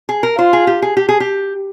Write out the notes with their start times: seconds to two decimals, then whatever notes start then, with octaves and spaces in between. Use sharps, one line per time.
0.09 G#4
0.23 A#4
0.38 F4 C5
0.53 G#4
0.67 G4
0.82 G#4
0.97 G4
1.09 G#4
1.20 G4